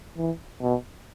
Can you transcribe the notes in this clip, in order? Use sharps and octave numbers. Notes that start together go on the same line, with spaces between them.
E3
B2